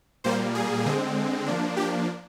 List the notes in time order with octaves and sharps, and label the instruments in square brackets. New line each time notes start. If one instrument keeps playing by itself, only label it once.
[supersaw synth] A#2 G3 A#3 C5
G#4
D3 G#3 C4
F3 A#3 D4
G4